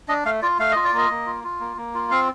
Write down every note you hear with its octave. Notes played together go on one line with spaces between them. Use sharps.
D4 D#5
A3 F5
F4 D5
A3 F5
F4 D#5
D5
A#3 D#5
A#3
F4
F4
A#3
A#3
F4
C4 F5